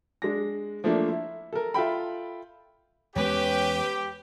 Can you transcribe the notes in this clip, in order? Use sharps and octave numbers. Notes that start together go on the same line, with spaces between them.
G#3 D4 A#6
F3 A3 A#3 D4
E4
A4 A#4
F4 A4 E5 G5 B5
E2 G#3 B3 C#4 G4 B4